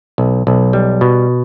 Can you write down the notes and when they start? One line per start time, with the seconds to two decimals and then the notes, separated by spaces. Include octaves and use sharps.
0.18 B1
0.47 B1
0.73 G3
1.01 B2